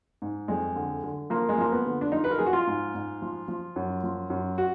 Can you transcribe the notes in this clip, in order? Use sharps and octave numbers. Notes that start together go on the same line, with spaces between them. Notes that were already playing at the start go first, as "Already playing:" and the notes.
G#2
F2 G#3
D3
D3
F3 A#3
G#3
F3 A#3
B3
D3
D4
F3 D#4
B4
A#4
F3 G#4
F#4
F4
G#2
G#2
F3
F3
F#2
F3
F#2
F#4